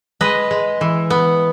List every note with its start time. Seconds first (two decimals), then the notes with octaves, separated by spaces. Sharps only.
0.21 G#3 B4 D#5
0.51 G#3
0.81 E3
1.10 B3